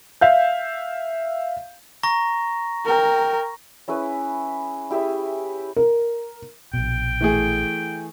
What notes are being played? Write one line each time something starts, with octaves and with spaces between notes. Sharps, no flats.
E5 F5 G6
A#5 C#6 A#6
A#4 G5
C#4 E4 G#4 B4
E4 G4 G#4 E5
A#4
A#1 B2 G5
E3 A3 G#4